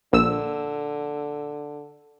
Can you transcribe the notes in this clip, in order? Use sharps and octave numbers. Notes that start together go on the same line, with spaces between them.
A#1 D3 E6